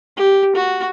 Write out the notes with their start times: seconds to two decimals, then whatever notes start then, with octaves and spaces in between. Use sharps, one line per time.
0.17 G4
0.56 F#4